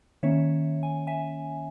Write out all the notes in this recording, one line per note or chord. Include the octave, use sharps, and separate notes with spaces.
D#3 A#3 C#4 C#5 E5
G#5
E5 G#5